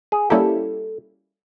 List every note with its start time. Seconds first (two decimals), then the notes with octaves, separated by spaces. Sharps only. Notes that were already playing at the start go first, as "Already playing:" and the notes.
0.12 G#4
0.30 G3 A#3 C#4 E4 G4 A4